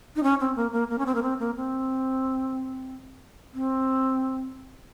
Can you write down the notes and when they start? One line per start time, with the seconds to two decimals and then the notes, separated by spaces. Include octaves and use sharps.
0.16 D#4
0.23 C#4
0.40 C4
0.56 A#3
0.72 A#3
0.90 A#3
0.98 C#4
1.06 C4
1.15 A#3
1.22 C4
1.40 A#3
1.56 C4
3.54 C4